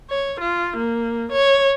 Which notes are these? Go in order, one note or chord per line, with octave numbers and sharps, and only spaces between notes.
C#5
F4
A#3
C#5